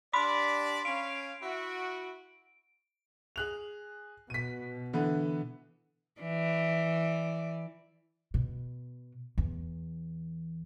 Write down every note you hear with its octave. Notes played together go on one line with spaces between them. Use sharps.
D4 G4 D5 B5 C6 B6
C#4 F5 D7
E4 F#4
G#4 F#6 F7
B2 B6 D#7
D3 E3 B3
E3 D5
B2
E2